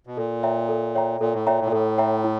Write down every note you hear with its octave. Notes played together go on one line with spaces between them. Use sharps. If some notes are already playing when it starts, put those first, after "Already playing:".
B2
A#2 A4
C#5 E5 G5 A#5
A4
C#5 E5 G5 A#5
A#2 A4
A2
A#2 C#5 E5 G5 A#5
A2
A#2
A2 A4
C#5 E5 G5 A#5
E4